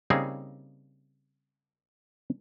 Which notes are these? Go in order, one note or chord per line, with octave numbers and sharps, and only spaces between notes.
C#3 G3 A#3 C4 D#4 G#4